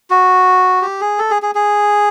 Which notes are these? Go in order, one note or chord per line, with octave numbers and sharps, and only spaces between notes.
F#4
G4
G#4
A4
G#4
G#4
G#4